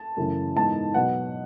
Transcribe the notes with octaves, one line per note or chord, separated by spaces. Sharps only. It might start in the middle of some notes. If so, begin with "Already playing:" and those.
Already playing: A5
F#2 C#3 E3 A3 C#4
G#2 E3 B3 D#4 A5
B2 F#3 B3 F#5